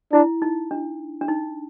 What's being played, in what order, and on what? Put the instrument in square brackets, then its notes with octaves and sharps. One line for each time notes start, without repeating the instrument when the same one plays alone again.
[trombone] D4 [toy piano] E4
[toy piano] D#4
D4
D4
D#4